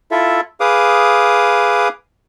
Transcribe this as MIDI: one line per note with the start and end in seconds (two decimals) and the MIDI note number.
0.11 0.41 64
0.11 0.41 65
0.11 0.41 69
0.11 0.41 76
0.60 1.88 68
0.60 1.88 71
0.60 1.88 77
0.60 1.88 86
0.60 1.88 87